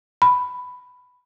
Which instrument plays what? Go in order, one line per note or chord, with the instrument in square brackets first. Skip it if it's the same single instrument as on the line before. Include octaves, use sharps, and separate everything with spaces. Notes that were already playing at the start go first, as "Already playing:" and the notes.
[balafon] B5